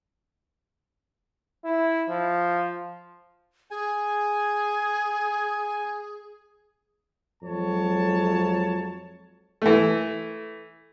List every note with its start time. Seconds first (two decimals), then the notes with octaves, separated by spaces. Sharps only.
1.65 E4
2.10 F3
3.71 G#4 G#5
7.43 F2 F#3 G#3 C#5 A5
9.62 E3 A3